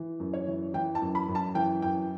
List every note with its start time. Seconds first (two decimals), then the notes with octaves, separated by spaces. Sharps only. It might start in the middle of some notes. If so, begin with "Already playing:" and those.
Already playing: E3
0.20 F#2
0.33 C#5
0.47 E3
0.74 E3 G5
0.95 A5
1.02 F#2
1.15 B5
1.28 F#2
1.35 A5
1.55 E3 G5
1.82 F#2 G5